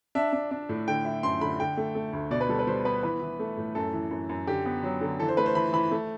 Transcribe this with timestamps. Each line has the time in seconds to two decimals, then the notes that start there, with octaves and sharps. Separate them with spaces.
0.15 D4 E5
0.33 D4
0.51 D4
0.69 A2
0.87 D3 G5
1.05 E4
1.23 F#2 C6
1.41 D3 B5
1.60 D3 G5
1.77 A3
1.95 A3
2.13 D2
2.31 B2 D5
2.41 B4
2.49 G3 A4
2.59 B4
2.67 G3 C5
2.85 B3 B4
3.03 E3 B4
3.21 E3
3.39 A3
3.57 A2
3.75 F#2 A4
3.93 E3
4.11 F#2
4.29 F#2
4.47 D3 G4
4.66 B3
4.83 F#3
5.01 D3
5.20 E3 A4
5.28 C5
5.37 A3 B4
5.46 C5
5.55 E3 B5
5.73 E3 B5
5.91 A3